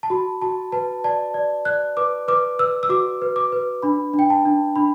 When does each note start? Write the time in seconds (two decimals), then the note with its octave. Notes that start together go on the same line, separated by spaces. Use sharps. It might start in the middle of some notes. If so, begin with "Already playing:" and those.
0.03 A5
0.10 F#4 B5
0.42 F#4 A5
0.72 B4 A5
1.04 D5 A5
1.34 D5
1.65 D5 F#6
1.97 B4 D6
2.28 B4 D6
2.59 B4 E6
2.83 E6
2.89 F#4 D6
3.22 B4
3.36 D6
3.52 B4
3.82 D4 B5
4.13 D4
4.19 G5
4.30 A5
4.46 D4
4.76 D4 B5